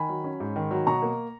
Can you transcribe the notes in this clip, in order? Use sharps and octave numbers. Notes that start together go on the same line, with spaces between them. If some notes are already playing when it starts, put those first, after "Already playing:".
Already playing: D#3 G#5 B5
F#3
C#4
G#2
D#3
F#3
B2 A#5 C#6
A#3